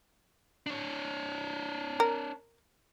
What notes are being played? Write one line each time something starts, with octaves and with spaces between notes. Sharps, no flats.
D4 C#5
A#4